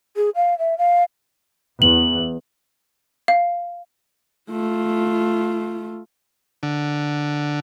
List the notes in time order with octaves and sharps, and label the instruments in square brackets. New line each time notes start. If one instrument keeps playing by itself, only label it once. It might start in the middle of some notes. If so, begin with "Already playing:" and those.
[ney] G#4
F5
E5
F5
[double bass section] E2 [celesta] F#7
[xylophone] F5
[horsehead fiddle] A3 F4
[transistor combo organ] D3